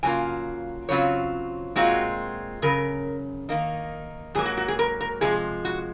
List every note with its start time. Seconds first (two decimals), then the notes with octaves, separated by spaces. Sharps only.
0.03 C#3 F#3 A#3 F4 G#5
0.89 C#3 F#3 C4 F4 C#5
1.76 A#2 G#3 C4 F4 F#4
2.62 F#2 C#3 A#4
3.49 D#3 A#3 D#4
4.35 G#2 F#3 A#3 G#4
4.45 F#4
4.57 F#4
4.68 G#4
4.79 A#4
5.01 A#4
5.21 C3 F3 G#3 G#4
5.65 F#4